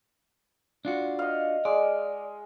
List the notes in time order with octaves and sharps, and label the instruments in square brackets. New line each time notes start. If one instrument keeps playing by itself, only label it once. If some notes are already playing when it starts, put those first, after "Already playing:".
[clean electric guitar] D4 F4 F#4
[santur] D#5 F5
[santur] G#3 [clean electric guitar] D5